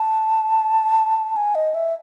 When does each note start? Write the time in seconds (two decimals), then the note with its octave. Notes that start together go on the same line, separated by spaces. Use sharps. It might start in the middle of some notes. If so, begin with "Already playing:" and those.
Already playing: A5
1.36 G#5
1.55 D#5
1.74 E5